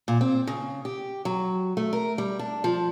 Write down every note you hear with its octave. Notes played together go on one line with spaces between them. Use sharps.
A#2
C4
C#3
G4
F#3
A3
A#4
G3
D4
F3